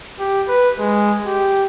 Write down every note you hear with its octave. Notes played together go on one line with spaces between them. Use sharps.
G4
B4
G#3
G4